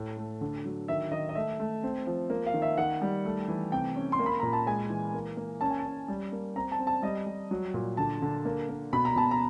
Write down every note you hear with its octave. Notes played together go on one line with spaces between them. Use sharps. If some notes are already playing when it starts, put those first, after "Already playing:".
Already playing: A2
A3
D3
F#3
D#3 E5
D#3 D#5
D#5
A3 E5
A3
C4
F3
A#3
F5
D#3
E5
D#3 F#5
G3
A3
E3
C3 G5
C#4
C6
A#3
B5
A#2 A#5
A5
G#3 G#5
E3
A#3
A#3
C#4 A5
G#5
A5
C#4
G3
A#3
C4 A#5
A5
C4
A5
G3 D#5
G3
F#3
A#2
D3 A5
D3
A#3
A#3
B2 B5
A#5
B2 A5
A#5